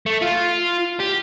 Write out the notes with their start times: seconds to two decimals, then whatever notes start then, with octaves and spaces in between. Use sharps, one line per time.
0.06 A3
0.22 F4
1.00 G4